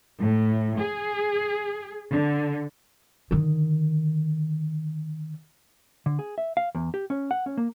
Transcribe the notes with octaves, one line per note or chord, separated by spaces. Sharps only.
A2
G#4
D3
D3 D#3
D3
G#4
E5
F5
E2
G4
C#4
F#5
C#4
A#3